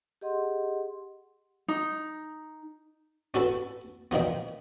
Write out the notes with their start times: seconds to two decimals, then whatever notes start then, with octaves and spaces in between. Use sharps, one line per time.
0.21 G4 G#4 D#5 F#5 C6
1.68 D#4
3.34 C#4 F#4 A4 B4
4.11 A#2 D#3 F3 B3